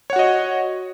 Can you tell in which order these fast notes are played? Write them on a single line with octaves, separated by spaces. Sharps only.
C#5 F#5 F#4 D#5